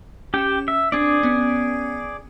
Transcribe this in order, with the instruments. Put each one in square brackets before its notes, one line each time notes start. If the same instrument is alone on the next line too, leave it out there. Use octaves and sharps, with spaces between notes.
[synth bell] C#4 E7 [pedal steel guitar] G4 G5
[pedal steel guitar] E5
[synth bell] C4 D4 [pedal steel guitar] G#4 D5
[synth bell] B3 C#4